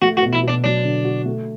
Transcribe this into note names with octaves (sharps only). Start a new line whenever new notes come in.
A3 F#4
F#4
B2
E4
B2 D4
F#3 D4
D3
F#4
A3